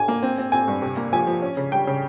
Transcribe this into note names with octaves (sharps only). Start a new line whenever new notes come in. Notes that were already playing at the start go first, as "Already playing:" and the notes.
Already playing: G#5
A#3
C4
C4
C4 G#5
G2
C3
A#3
F3 G#5
F3
C#4
C#3
G3 G5
C#3